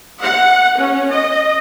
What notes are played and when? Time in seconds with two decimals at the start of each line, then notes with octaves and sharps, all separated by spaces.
0.21 F#5
0.77 C#4
1.09 D#5